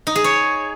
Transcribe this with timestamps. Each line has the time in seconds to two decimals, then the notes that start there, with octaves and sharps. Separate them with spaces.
0.07 D#4
0.16 G#4
0.24 C#5